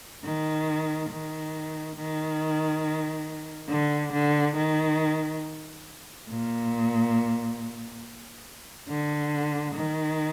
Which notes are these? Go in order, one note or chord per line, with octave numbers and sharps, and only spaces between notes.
D#3
D#3
D#3
D3
D3
D#3
A#2
D3
D#3